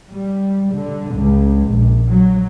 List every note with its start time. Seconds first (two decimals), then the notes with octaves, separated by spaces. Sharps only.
0.11 G3
0.74 D3
1.15 C#2
1.68 A#1
2.09 F#3